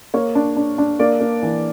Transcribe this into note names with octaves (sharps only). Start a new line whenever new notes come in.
A#3 C#5
D4
D4
D4
A#3 D5
A#3
E3